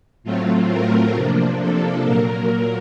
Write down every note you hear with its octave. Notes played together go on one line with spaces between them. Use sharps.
A2 F#3 A3 C4 F4
A#4
C3 F3 A#3 D4
A4
A#2 F#3 A#3 A#4